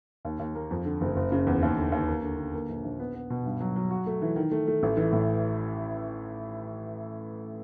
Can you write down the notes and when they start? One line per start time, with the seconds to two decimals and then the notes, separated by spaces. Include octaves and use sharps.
0.25 D#2
0.39 D#2
0.55 A#3
0.71 F2
0.85 D3
1.01 F#1
1.16 F#1
1.32 C#3
1.47 E2
1.63 D#2
1.77 D3
1.92 D#2
2.08 A#3
2.23 D3
2.38 D3
2.54 A#3
2.69 A#1
2.84 A#1
3.00 B3
3.15 B3
3.30 B2
3.46 G2
3.60 F#3
3.76 F#3
3.91 F#4
4.06 A3
4.22 E3
4.36 D#3
4.51 A3
4.67 A3
4.83 A1
4.97 E3
5.12 A2